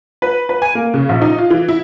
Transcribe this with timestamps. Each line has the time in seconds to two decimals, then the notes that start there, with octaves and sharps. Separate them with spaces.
0.22 B4
0.49 B4
0.62 G#5
0.75 A#3
0.94 C#3
1.09 A#1
1.22 D#4
1.38 F4
1.50 E3
1.68 E4